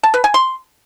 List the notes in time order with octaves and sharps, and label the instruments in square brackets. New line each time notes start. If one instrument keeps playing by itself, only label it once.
[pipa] A5
B4
G#5
C6